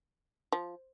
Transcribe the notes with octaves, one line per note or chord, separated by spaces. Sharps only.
F3